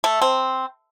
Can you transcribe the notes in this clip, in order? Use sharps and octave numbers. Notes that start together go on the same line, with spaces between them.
A3
C4